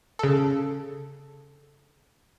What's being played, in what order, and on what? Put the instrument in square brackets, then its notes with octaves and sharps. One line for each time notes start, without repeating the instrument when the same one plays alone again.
[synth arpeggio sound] C#3 A4